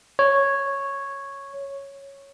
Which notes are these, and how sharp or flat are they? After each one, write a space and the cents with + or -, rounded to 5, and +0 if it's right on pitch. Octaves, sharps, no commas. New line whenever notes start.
C#5 -5